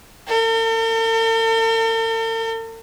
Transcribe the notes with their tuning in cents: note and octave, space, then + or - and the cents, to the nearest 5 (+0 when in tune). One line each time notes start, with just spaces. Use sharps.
A4 +45